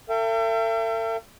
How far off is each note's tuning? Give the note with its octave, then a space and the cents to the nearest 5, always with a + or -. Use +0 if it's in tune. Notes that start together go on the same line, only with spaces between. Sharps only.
A4 +45 E5 +40 G5 +0